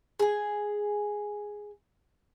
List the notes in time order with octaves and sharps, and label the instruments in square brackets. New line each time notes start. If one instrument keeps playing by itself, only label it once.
[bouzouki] G#4 G#5